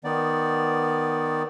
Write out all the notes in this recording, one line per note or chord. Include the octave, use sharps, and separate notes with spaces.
D#3 B3 D5